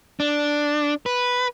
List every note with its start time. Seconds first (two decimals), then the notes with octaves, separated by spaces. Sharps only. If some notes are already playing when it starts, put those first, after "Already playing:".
0.20 D4
1.06 B4